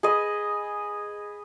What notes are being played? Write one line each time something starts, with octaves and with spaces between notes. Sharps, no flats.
G#4 B4 D#5